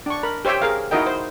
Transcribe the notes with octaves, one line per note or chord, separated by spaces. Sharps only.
D4 C#6
A#4 B5
G4 C5 C#5 E5 G5
G#4 A#4 F5
D#4 E4 F#4 A#4 D#5 G5
C5